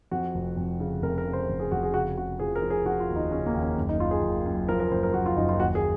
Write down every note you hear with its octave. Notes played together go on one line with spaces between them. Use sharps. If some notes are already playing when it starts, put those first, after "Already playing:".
F2 F#4
F1
F2
C#3
F1 A#4
A#4
C#3
C5
F1
G#4
F1 F#4
G#4
C#3 F#4
C#3 F#4
F3 G#4
A#4
F3
G#4
F3 F#4
F4
D#2
D#4
C#3 C#4
A#3
D#2
C#4
F#1
D#4
F#1 F4
G#4
F#1
F#2
F3 A#4
A#4
F#1 C5
A#4
F#1 F#4
F4
F#1 D#4
F4
D#2 F#4
G#4